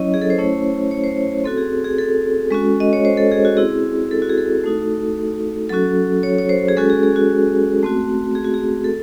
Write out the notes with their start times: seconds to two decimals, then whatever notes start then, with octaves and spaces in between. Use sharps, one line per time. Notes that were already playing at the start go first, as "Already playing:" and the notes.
Already playing: F#3 C#4 E4 C#5 D#5
0.14 G#4
0.21 A4
0.30 C5
0.38 A3 C#4 E4 C#5
0.91 C#5
1.04 C5
1.17 C#5
1.44 C4 F#4 A4
1.58 G#4
1.84 G#4
1.98 A4
2.51 G#3 C#4 F#4
2.80 D#5
2.93 C#5
3.05 C5
3.17 A4
3.31 G#4
3.45 F#4
3.57 C4 E4 G#4
4.11 A4
4.22 F#4
4.29 G#4
4.38 A4
4.64 A3 D#4 F#4
5.69 F#3 C#4 F#4 A4
6.23 C#5
6.38 C#5
6.49 C5
6.68 G#4
6.77 G#3 C#4 F#4 A4
6.90 G#4
7.03 G#4
7.16 F#4
7.83 A3 C4 F#4
8.35 G#4
8.44 F#4
8.54 G#4
8.84 A4